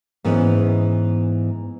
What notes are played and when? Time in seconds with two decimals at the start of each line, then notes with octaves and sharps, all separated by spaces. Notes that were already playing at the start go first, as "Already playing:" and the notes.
0.24 G#2 E3 B3 C#4